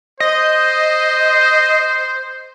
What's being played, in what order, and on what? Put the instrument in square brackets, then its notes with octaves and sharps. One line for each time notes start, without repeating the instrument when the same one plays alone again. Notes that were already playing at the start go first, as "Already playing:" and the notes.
[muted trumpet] C5 [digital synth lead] D#5